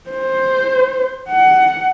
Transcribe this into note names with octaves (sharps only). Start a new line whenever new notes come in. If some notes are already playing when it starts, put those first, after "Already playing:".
C5
F#5